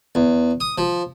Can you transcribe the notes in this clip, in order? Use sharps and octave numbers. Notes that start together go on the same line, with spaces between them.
E2
D#6
F3